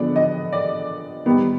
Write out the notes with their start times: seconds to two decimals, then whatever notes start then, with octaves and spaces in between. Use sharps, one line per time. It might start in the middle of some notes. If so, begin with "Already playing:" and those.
Already playing: D3 F3 G#3 B3 D4 D5
0.16 D#5
0.53 D5
1.26 D#3 G3 B3